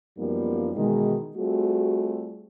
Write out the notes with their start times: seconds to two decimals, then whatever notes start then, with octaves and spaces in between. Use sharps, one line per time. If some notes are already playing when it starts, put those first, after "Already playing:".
0.18 F#2 F3 G3 A#3 B3 D#4
0.76 B2 D#3 E3 G#3
1.37 G3 A3 C4 F4 F#4 G#4